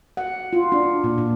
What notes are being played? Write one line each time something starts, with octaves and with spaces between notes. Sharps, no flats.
F#5
F4
D4
A#2
A#2